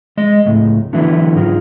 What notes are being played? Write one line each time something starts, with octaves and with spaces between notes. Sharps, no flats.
G#3 D#5
C#2 A2
D3 E3 F#3 B3 E4
G#2 D#4 F4